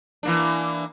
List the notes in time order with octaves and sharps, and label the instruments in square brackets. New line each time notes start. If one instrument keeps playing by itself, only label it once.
[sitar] E3 A#3 D4